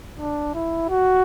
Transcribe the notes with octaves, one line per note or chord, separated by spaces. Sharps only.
D4
E4
F#4